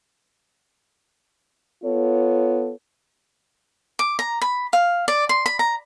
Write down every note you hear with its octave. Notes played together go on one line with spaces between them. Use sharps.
B3 F4 A4 C#5
D6
A#5
B5
F5
D5
C6
B5
A#5